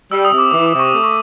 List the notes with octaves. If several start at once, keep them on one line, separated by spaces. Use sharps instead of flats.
G3 E6
D#6
C3
D6
E3 D6
D6
C3
C#6
A3
C#6